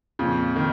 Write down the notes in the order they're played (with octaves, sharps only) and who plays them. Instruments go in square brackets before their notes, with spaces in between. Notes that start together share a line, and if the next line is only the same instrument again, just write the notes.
[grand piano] F2 [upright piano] A#2 C#3
[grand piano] D#3